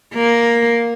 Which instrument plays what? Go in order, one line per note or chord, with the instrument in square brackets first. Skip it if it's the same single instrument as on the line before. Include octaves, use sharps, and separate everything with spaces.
[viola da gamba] A#3